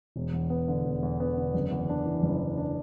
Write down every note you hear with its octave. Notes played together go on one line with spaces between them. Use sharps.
E1
E2
B3
D3
E1
E2
B3
D3
F#1
E2
D4
E3
F#1
E2
D4